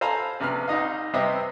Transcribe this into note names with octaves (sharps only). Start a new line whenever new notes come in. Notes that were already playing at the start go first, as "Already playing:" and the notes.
A4 C5 F5 G#5 A#5 B5
A#1 C3 B4 F6
C2 D#4 D#5 F5
C3 G3 C4 B4 D#5 E5